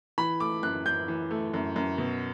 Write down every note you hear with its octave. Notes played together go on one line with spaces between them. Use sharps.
E3 B5
A3 D6
F#2 F#6
F#2 G6
E3
A3
F#2
F#2
B2